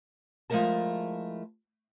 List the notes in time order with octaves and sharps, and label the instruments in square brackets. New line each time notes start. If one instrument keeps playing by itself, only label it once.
[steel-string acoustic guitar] F3 G#3 A3 E4 A#4 A5